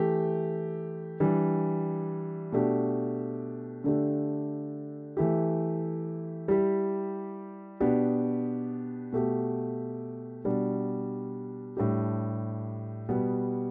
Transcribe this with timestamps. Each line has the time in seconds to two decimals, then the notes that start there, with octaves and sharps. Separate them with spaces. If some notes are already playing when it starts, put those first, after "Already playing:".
Already playing: E3 A3 G4
1.20 E3 G3 D4
2.52 B2 A3 D4 G4
3.84 D3 A3 D4 G4
5.17 E3 A3 E4 G4
6.48 G3 E4 G4
7.80 B2 B3 D4 G4
9.13 B2 A3 G4
10.45 B2 G3 D4
11.77 A2 G3 D4 G4
13.09 B2 G3 B3 G4